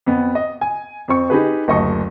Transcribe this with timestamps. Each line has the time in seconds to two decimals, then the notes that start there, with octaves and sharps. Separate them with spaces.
0.06 F2 B3
0.35 D#5
0.61 G#5
1.08 F2 C4 C#6
1.30 D#4 G4 G#4 B4
1.68 F#1 D2 D#5 A5 C#6